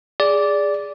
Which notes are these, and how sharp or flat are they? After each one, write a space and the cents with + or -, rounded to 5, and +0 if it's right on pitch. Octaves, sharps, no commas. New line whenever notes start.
G#4 -10 D5 -10